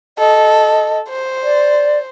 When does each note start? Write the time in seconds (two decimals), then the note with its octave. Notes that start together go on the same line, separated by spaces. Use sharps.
0.18 A4 D#5
1.09 C5
1.44 D5